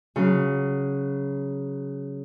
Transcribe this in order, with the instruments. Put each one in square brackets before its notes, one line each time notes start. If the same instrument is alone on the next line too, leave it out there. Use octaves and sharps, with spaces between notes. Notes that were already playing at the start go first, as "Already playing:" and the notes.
[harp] C#3 F#3